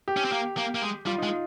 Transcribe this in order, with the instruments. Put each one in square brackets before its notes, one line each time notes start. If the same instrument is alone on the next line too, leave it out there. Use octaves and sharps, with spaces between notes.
[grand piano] G4
[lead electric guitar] C#4
C4
A#3
A#3
A#3
G#3
[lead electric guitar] G3 [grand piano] F4
[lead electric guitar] G#3 [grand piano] D#4
[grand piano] F4